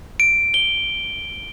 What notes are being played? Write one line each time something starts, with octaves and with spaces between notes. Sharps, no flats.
D7
G7